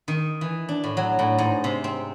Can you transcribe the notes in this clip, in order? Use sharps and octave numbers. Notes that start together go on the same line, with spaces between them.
D#3
E3
D4
A2
F#3
A2
G#2
C3
C4